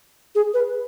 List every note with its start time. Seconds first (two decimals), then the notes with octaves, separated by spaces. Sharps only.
0.35 G#4
0.54 B4